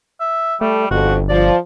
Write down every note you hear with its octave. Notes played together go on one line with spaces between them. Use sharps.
E5
G3 A3
G1 F2 F#4
F3 D5